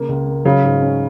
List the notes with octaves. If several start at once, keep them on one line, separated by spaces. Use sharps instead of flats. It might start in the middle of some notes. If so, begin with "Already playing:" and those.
Already playing: C#3 A#3
C#2
A#3
C#3 F#3
G#2
C#4